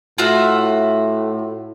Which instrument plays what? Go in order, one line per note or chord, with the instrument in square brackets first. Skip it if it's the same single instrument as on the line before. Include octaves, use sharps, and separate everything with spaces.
[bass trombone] A2 [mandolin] F4 F#4 E5